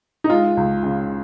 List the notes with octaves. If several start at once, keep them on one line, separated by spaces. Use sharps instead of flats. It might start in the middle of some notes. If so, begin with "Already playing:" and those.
D#4
G#3 F4
C#2
C#3